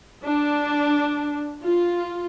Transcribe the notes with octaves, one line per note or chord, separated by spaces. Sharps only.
D4
F4